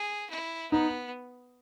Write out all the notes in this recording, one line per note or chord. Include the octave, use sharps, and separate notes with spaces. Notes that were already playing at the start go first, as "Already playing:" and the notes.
Already playing: G#4
E4
B3 D#4